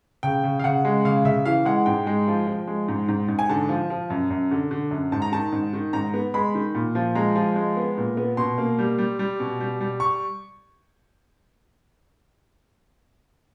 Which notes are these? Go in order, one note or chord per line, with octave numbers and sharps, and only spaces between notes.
C#3 G5
C#3
F5
C#3 F#5
G#3
C#3 F5
C#3 E5
E3 F5
G#3 F#5
G#2 G5
G#3
F3
F3
G#3
G#2
G#2
G#2
G#5
D3 A5
F3
F3
F#2
F#2
D3
D3
F#2
G#2 A5
A#5
D#3 A5
G#2
D#3
G#2 A#5
B3
G#3 B5
D#3
A#2
F3
G#3 A#5
F3
G#3
B3
A#2
B3
B2 C6
A#3
G3
G3
G3
B2
G3
G3
C#6